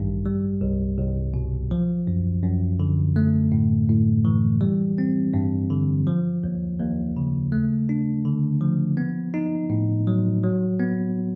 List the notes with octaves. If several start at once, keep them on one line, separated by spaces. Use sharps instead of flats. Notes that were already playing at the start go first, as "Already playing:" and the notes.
Already playing: A1 G2 D#3 G3
G3
C2
C2
B2
F3
F#2
F#2
D3
A3
A2
A2
E3
G3
C4
G2
D3
F3
D#2
D#2
C#3
A3
D4
D3
F3
B3
D#4
A2
F#3
F#3
B3